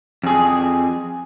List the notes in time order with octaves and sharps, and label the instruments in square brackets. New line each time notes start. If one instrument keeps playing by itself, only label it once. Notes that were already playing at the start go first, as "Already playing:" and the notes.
[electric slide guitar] F2 G#4